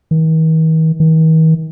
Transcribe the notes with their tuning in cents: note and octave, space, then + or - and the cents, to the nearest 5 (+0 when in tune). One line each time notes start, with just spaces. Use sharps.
D#3 +45
D#3 +45